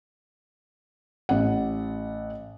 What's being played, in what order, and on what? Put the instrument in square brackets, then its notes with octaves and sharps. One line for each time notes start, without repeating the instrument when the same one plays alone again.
[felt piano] A1 F#5